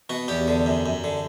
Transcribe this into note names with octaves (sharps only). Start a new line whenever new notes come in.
B2 F#4
E2 G4
D3
F#2
F#2
D3